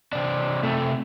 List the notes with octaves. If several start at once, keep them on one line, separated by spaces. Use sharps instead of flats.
C3 D4
C3 A3